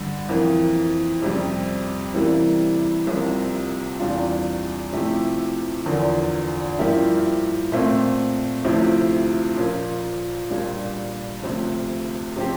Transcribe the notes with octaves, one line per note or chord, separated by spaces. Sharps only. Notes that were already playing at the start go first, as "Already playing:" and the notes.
Already playing: G2 D3 G3
F2 E3 A#3
F2 C3 G3
C3 E3 G3 A#3
C2 C3 F3 A#3
E2 C3 G3 D4 F4
C3 F3 A3 E4 G4
E2 D3 F3 A#3
G2 F3 A#3 E4 G4
A#2 A3 C4
D2 C3 F3 C4 E4
A#2 F3 A#3
A#2 G3 D4
D2 C3 F3
C3 F3 C4 G4